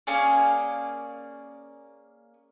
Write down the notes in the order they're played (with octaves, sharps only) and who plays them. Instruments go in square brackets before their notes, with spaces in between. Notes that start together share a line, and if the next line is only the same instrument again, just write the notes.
[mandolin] A#3 C#4 G#4 D5